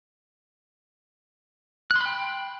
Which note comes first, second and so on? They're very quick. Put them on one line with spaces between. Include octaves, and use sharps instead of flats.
F#6 C6 B5 G5